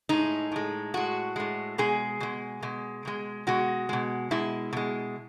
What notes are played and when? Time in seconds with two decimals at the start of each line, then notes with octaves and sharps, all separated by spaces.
0.09 A2 G#3 D#4
0.52 A2 G#3
0.94 A2 G#3 F#4
1.36 A2 G#3
1.78 B2 G#3 G#4
2.20 B2 G#3
2.62 B2 G#3
3.05 B2 G#3
3.47 B2 G#3 F#4
3.89 B2 G#3
4.31 B2 G#3 E4
4.73 B2 G#3